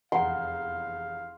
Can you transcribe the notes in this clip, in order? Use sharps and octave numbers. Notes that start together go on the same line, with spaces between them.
F1 E2 F5 F#5 G#5 A#5 C6